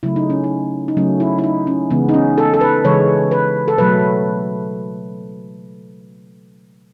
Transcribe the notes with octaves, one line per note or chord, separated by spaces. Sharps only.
C#3 F#3 A3 E4
D#4
C#4
D#4
D#4
C#3 F#3 A3 C#4
E4
E4
D#4
C#4
C#3 E3 G#3 B3
D#4
C#4
A4
A4
B4
C#3 E3 G#3 C#5
B4
A4
B2 F#3 A3 B4